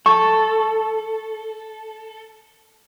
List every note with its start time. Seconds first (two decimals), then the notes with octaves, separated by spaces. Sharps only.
0.06 A4 C#6